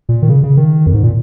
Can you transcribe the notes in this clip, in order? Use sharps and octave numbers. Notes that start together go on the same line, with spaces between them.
A#2
D#3
C#3
C#3
D#3
F2
G#2
A#2